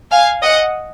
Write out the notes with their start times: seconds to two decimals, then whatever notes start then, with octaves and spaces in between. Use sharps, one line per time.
0.11 F5 G#5
0.43 D#5 F#5